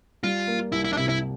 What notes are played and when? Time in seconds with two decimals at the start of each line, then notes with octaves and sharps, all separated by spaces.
0.24 G3 F4
0.47 A#3
0.72 C2 E4
0.84 E4
0.93 D4
0.97 C3 E4
1.09 E4